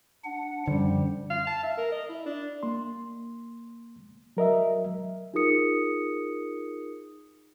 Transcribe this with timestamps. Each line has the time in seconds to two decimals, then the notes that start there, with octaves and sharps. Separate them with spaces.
0.24 D4 F#5
0.68 F#2 D3 F3 G3
1.30 F5
1.47 A5
1.63 E5
1.78 A#4
1.92 D#5
2.09 E4
2.26 D4
2.63 A#3 C6
4.37 F#3 A#4 D#5 E5
5.34 D#4 F4 G#4 A#4 D#6 C#7